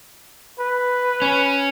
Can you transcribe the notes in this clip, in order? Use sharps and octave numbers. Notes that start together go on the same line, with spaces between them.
B4
C#4